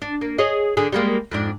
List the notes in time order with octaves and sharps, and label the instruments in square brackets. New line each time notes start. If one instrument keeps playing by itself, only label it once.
[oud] D4
A#3
G#4 C#5 D#5
D3 G#4
G3 G#3 A#3
F2 G#2 D4